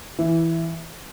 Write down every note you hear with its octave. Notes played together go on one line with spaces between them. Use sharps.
E3